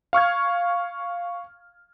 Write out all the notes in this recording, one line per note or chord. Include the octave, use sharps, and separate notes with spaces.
F5 C#6 F6 G#6